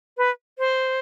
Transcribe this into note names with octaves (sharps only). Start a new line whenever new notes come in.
B4
C5